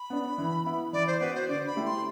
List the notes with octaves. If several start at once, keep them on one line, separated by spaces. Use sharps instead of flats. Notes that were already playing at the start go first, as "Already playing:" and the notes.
Already playing: B5
B3 D4
E3
B3 E4
E3 D5
C5
B3 F#4 B4
C5
D3 D5
B5
A3 E4 G4
C6